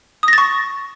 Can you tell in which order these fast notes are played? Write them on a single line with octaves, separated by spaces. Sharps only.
D#6 A#6 A6 C#6